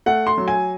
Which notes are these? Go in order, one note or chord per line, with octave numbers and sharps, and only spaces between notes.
A3 F#5
C6
F#3
G#5